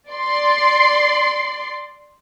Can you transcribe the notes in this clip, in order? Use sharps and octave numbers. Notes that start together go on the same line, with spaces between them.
D5 C6